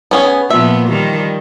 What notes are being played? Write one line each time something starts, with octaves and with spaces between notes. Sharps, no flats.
B3 C#4 G#4
A#2 F3 B3 E5
D#3 F3 G3